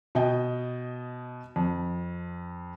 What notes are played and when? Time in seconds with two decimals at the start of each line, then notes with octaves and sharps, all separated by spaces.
0.15 B2 D#5 G5
1.56 F2